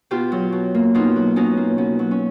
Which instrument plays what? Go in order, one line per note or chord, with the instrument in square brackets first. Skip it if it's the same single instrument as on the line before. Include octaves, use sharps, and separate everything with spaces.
[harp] B2 F4 G4
F#3
B2
A#3
B2 D#4 F4
F#3
B2 C#4 D#4
A#3
B2 C#4
F#3
C#4